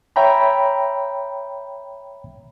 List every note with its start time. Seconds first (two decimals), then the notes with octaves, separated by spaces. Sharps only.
0.16 C#5 E5 G5 A#5 B5